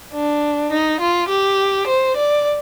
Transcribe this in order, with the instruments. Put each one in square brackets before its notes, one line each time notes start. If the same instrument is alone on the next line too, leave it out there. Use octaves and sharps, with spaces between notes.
[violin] D4
D#4
F4
G4
C5
D5